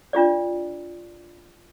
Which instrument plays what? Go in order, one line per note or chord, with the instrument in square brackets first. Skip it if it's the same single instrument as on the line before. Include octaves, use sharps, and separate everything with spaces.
[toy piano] D4 F4 G4 D5